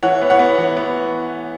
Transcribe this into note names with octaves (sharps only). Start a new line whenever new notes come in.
E3 C#5 F#5
B3
C#5 F#5
B3
E3
B3